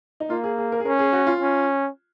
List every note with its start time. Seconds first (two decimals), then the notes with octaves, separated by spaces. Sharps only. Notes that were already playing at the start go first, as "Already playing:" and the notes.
0.20 D#4
0.30 A#3 F4
0.44 G#4
0.58 G#4
0.72 A#4
0.80 G#4
0.85 C#4 A#4
0.99 G#4
1.13 F#4
1.27 F4
1.40 C#4